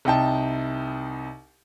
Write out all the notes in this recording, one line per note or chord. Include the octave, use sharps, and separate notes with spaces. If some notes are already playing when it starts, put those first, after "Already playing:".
C2 D#4 G5 A5